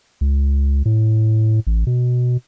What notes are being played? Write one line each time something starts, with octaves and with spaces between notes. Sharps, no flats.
C#2
A2
A1
B2